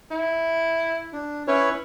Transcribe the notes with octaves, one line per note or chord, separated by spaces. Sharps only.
E4
D4
C#4 E4 B4 C#5